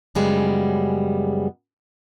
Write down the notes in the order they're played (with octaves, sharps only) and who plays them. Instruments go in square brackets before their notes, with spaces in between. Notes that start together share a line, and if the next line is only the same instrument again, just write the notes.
[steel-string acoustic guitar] F#2 C#3 G3 G#3 B3